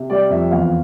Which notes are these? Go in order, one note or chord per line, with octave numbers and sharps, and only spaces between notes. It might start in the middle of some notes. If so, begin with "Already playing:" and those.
Already playing: C3
G3 D5
F2 E5
E2 F5